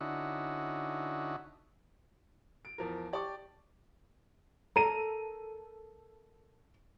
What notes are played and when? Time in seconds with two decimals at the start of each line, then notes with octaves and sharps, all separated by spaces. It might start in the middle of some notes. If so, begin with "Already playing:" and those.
0.01 D3 C#4 D#4 E4 F#4
2.65 D7
2.78 E2 F3 A#4
3.13 G4 D5 A5 C#6 D6
4.76 A4 A#4 D#7